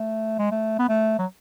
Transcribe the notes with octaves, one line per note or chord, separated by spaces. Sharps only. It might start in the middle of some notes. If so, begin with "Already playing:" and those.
Already playing: A3
G#3
A3
B3
A3
F#3